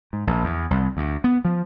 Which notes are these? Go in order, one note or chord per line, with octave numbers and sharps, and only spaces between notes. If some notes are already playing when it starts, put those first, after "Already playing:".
G#2
A#1
E2
C2
D2
B3
F3